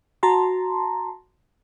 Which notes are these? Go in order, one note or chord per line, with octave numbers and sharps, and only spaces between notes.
F#4 A5 A#5 C6